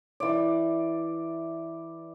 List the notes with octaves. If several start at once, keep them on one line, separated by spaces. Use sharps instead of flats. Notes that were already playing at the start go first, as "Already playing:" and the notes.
E3 D5